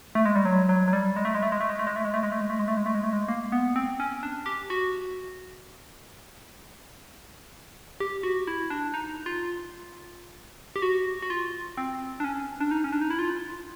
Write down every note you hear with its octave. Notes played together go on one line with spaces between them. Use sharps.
A3
G#3
G3
F#3
F#3
F#3
G3
G#3
A3
G#3
A3
G#3
A3
G#3
A3
G#3
A3
G#3
A3
G#3
A3
G#3
A3
G#3
A3
G#3
A3
G#3
A3
G#3
A#3
B3
C4
C#4
D4
G4
F#4
G4
F#4
E4
D4
D#4
F4
G4
F#4
F#4
F4
C4
D4
C#4
D4
D#4
C#4
D4
D#4
E4
F4